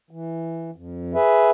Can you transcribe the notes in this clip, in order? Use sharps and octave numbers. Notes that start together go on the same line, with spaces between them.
E3
F2
G#4 B4 E5